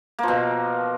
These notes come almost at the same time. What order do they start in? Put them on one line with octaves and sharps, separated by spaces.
A#3 F3 B2